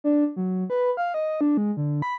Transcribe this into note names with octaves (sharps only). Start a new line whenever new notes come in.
D4
F#3
B4
F5
D#5
D4
G#3
D3
B5